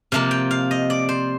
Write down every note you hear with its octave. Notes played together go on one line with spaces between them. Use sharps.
C3 F3 A#3 F5
G5
F5
D#5
D5
C5